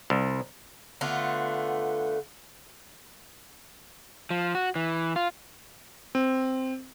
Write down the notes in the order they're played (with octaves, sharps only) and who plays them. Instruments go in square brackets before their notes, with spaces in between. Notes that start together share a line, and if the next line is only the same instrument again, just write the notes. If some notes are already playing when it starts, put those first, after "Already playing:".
[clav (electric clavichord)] C2
[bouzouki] D3 A3 B3 F4
[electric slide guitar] F3
F#4
E3
F4
[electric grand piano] C4